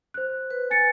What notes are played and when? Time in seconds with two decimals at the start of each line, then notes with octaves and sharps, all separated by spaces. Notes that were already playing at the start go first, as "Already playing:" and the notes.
0.14 C5 F#6
0.51 B4
0.70 G#5 A6 C#7